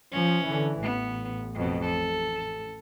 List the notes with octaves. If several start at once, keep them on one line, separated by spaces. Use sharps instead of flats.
F3 C#4
D3 E3
A1 B3
F2 B2
A4